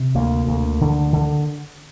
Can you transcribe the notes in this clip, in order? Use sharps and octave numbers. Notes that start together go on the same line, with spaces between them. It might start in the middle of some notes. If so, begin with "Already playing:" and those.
Already playing: C3
D2 A#3
D2
D3
D3